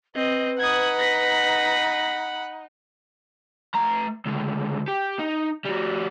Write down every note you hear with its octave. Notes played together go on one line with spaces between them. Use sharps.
C4 B4 D#5
D#4 F#5 B5 D#6 G#6
A#6 B6
A3 A#5
C#2 D3
G4
D#4
G3 F#4